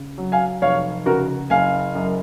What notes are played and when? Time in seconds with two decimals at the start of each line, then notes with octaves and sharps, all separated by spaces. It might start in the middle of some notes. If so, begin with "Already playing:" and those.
Already playing: C#3
0.18 F#3
0.32 F5 G#5
0.62 F1 C#5 F5
1.06 C#3 F#4 A#4
1.50 F#1 F5 G#5
1.95 F#2